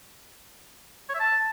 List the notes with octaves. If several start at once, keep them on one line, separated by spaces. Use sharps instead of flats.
C#5
E5
A5